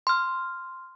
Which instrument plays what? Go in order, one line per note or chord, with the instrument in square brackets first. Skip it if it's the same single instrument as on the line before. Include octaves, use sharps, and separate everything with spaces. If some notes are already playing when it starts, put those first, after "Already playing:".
[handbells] C6 F6